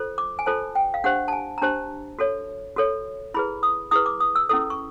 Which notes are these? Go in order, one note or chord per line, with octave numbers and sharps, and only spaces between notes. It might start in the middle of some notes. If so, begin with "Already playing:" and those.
Already playing: F4 A4 C5
D6
G#5
F4 A4 C5 A5
G5
F5
D4 G4 C5 F#5
A5
G#5
A#5
D4 G4 C5 A5
F#4 A4 C#5
F#4 A4 C#5
E4 G#4 B4 B5
D#6
E4 G#4 B4 D#6
D6
D#6
E6
C#4 E4 A4 D#6
C#6